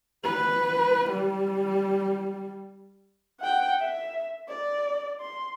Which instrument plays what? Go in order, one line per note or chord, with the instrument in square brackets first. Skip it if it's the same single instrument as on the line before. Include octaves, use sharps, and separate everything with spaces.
[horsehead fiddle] B4
G3
[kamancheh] F#5 G5
E5
D5
C6